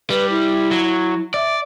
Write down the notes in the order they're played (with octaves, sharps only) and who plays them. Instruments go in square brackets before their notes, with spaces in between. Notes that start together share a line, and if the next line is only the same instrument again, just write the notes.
[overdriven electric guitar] G3 [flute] B4
[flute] E4
[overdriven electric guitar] F#3
[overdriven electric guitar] D5 [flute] E5